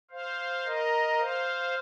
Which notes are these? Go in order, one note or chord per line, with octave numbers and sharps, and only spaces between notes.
C5 F5
A#4 D#5
C5 F5